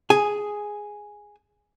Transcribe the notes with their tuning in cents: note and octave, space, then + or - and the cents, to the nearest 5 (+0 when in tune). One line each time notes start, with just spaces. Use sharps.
G#4 +0 G#5 +0